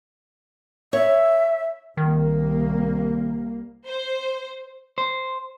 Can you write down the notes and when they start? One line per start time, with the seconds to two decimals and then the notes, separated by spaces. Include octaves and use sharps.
0.93 C#5 E5
1.97 C2 D#3 A#3
3.87 C5
4.98 C5